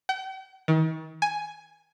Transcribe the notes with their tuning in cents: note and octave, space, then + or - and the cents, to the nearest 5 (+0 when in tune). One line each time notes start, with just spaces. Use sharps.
G5 -45
D#3 +40
G#5 +5